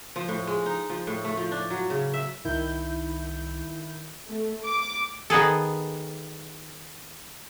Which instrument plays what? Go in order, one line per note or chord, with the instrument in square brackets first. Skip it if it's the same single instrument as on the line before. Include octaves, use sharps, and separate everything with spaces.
[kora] F3
A2
G#3
D#4
F3
A2
A3
F3
D4
F#3
C#3
E5
[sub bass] C2 [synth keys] D#3 E4 G6
[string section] A3
D6
[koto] D#3 B3 G#4 A4